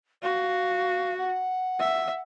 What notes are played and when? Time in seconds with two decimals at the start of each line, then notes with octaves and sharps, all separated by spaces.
0.23 F#4 F5
1.18 F#5
1.80 E5